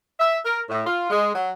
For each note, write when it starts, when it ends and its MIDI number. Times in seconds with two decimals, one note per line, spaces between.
0.18 0.37 76
0.44 0.60 70
0.69 0.83 45
0.85 1.07 65
1.10 1.30 56
1.35 1.49 54